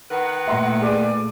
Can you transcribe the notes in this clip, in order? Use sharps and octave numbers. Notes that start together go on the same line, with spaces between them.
D#3 B4 F#5
A#2 A3 E5 C6 A#6
G#4 D5 D#7